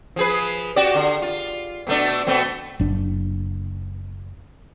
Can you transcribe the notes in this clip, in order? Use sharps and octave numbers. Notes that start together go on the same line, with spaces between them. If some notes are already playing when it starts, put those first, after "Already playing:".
F3 G#4 B4
F#4 G4 D5
D3
F4
B2 A3 D4
B2 A3 C4
F#1 D4